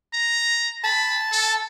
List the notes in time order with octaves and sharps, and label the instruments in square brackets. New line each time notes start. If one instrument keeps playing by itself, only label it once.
[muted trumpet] A#5
[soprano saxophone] A5 [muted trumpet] B5
[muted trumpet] A4